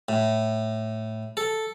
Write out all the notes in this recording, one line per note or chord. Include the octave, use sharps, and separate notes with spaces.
A2
A4